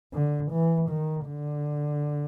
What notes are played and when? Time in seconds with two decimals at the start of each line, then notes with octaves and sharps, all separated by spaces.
0.13 D3
0.51 E3
0.89 D#3
1.28 D3